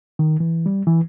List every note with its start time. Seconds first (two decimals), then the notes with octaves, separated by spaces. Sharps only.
0.19 D#3
0.40 E3
0.66 G3
0.87 E3